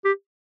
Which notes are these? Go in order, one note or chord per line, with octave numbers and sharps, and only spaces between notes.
G4